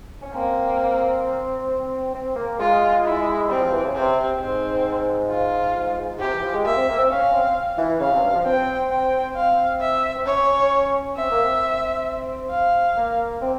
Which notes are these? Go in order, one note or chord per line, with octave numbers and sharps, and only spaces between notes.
C#4
A#3 C4
C4
A#3
G#3 F4
E4
G3 C4
F3
E3
C#3
C3 C4
G#2 C4
F4
G#2
G#2
C3 G4
E3
F3
G#3
A#3 E5
C4
A#3
C4
C#4 F5
C4
E3
C#3 F5
C3
G2
F3
C4 G5
G5
C4 F5
E5
C4
C#4 C#5
C4 E5
A#3
C4
F5
A#3
C4